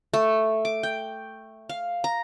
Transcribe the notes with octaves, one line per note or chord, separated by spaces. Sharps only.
A3
D6
G5
F5
A#5